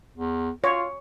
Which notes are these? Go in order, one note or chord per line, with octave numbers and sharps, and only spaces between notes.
E2
F4 C#5